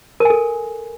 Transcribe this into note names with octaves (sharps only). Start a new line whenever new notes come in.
A4 A#4 G#5